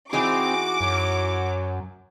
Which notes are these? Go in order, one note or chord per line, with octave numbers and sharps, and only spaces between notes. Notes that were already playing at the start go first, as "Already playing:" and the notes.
E3 C4 D#4 F#4 G#4 D6
F#2 F#3